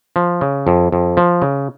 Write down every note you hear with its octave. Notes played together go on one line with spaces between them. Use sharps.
F3
C#3
F2
F2
F3
C#3